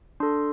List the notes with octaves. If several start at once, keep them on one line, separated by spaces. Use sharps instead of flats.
D4 A4 C6